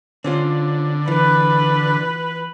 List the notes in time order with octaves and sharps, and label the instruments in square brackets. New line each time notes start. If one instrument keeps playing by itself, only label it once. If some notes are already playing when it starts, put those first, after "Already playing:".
[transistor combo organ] D3 [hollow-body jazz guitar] C4 C#4 F4
[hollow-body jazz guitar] E3 [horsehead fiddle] B4